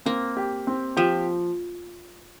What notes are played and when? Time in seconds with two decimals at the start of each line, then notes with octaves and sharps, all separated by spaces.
0.06 A#3 C4
0.37 G4
0.67 C4
0.97 F3 G4